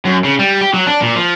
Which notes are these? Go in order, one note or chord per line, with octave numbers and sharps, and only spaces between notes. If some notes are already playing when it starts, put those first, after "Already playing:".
F#2
C#3
G3
G4
F#3
D4
A#2
F3